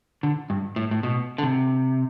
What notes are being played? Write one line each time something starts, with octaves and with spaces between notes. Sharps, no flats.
D3
G2
A2
A2
B2
D3
C3